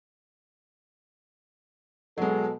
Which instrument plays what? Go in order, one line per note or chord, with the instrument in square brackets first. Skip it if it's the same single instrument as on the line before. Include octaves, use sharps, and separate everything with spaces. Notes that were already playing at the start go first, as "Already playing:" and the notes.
[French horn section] B2 A4 [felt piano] F#3 G#3